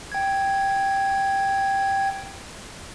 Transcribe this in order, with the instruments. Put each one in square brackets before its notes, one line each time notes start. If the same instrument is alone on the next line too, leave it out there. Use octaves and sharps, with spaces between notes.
[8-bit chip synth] G5 G#6